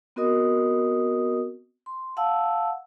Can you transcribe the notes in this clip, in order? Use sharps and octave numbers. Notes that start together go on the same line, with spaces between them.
B3 C4 F#4 A#4 D#5 D#6
C6
F5 F#5 A5 E6